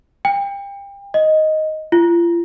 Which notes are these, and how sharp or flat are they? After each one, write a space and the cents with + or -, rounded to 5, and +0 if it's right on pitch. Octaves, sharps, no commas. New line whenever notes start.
G5 +30
D#5 +5
F4 -40